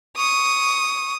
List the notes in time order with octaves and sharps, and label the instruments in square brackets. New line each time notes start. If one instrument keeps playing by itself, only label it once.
[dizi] C#6 [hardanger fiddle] D#6